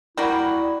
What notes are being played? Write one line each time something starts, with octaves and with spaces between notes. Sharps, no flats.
G3 A#3 E4 F#4